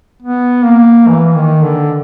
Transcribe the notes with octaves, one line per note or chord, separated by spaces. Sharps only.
B3
A#3
E3
D#3
D3